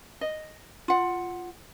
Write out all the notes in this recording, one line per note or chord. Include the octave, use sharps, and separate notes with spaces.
D#5
F4 F#5